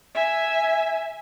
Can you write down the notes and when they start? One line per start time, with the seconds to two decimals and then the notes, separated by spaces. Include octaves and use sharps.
0.14 E5 G#5